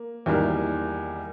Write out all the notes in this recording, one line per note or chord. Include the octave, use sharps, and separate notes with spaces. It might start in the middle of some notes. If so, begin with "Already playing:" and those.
Already playing: A#3
E2 D#3 G3 A#3